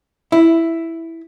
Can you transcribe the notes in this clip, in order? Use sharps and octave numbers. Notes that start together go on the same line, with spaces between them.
E4